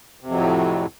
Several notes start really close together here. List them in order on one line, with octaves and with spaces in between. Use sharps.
C3 F2 F#3 A2